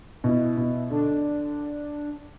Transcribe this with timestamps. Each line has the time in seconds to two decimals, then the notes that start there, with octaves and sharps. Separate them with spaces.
0.24 B2 E4
0.57 B2
0.90 D3 D4